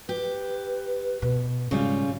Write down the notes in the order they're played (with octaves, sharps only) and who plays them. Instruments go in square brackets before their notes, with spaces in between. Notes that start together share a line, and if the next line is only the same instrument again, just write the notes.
[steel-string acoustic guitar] G4 [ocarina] B4
[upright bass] B2
[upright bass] G#2 [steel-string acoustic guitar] C#3 G3 F4